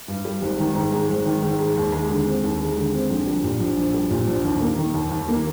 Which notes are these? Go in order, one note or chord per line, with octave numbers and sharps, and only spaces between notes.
G2
G3
G#1
D#3
G#2
G#3
G#1
D#3
G#2
G#3
D#2
G#3
D3
C4
D#2
G#3
D3
C4
A#1
G3
A#2
A#1
A#1
G3
A#2
A#1
D#2
A#3
D#3
D#2
D#2
A#3